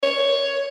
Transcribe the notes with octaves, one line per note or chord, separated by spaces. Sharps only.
C#5